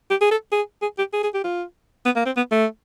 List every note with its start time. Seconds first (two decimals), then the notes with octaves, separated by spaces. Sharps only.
0.10 G4
0.21 G#4
0.31 A4
0.52 G#4
0.82 G#4
0.98 G4
1.13 G#4
1.23 G#4
1.34 G4
1.44 F4
2.05 B3
2.16 A#3
2.26 C4
2.37 B3
2.51 A3